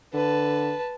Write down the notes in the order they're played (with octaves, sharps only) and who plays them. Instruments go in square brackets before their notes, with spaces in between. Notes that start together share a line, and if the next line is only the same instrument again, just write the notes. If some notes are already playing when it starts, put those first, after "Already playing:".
[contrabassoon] D3 [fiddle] B4 A5